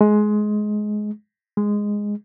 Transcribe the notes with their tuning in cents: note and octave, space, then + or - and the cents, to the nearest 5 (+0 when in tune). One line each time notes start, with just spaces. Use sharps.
G#3 +20
G#3 -5